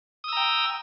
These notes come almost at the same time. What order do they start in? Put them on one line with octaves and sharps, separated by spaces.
D#6 E6 A#5 G5